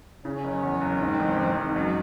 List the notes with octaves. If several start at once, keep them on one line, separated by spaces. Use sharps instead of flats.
C#3 C#4
F#1
E2
F#1
G#2 C4
A1
A1
G#2
F#2